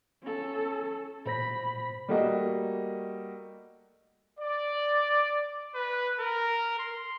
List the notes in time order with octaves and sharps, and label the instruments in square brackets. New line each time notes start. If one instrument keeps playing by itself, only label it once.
[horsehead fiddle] C#4 A4
[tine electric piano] A#2 C5 A#6 [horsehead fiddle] B5
[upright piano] G3 A3 A#3 F#4 D#5
[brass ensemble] D5
[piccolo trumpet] B4
A#4
C6